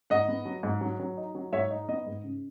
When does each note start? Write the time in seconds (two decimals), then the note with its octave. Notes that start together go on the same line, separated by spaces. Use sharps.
0.10 G#2 D#5 F#5
0.28 B3
0.46 F#3
0.63 G#2
0.81 F#3
1.00 F#3
1.17 D#4
1.35 F#3
1.52 G#2 C#5 E5
1.71 D#4
1.88 B3 D#5
2.06 G#2
2.24 C#3